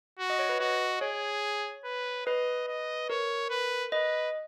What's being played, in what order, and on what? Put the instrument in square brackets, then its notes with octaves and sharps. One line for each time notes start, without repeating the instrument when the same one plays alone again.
[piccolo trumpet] F#4
[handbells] D#5
C#5
B4
[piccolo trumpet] F#4 [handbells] D#5
[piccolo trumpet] G#4 [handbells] C#5
[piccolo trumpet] B4
[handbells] B4 [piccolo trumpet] D#5
[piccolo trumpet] D#5
[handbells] A#4 [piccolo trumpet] C#5
[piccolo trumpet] B4
[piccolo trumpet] B4 [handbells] D#5